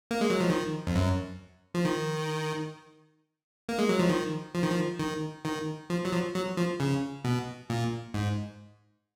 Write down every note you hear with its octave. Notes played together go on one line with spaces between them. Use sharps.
A#3
G#3
F#3
F3
D#3
F2
F#2
F3
D#3
A#3
G#3
F#3
F3
D#3
F3
D#3
F3
D#3
D#3
F3
F#3
F3
F#3
F3
C#3
B2
A#2
G#2